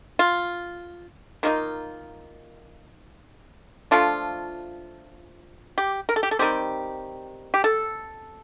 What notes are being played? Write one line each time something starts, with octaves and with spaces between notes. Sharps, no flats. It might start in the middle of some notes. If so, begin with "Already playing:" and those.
F4
D#3 A#3 D#4 F4
F3 A3 D4 F4
G4
A#4
A4
G4
A4
D#3 G3 C4 G4
G4
A4